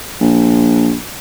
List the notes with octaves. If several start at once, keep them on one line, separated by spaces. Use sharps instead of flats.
A#1